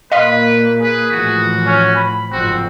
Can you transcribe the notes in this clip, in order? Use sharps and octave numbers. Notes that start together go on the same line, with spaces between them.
A#2 A#3 B4 D#5 F5 C6
G#4 B4
A2 E3 F3 F#4
C#4
B5
F#1 F2 G#2 C4 F#4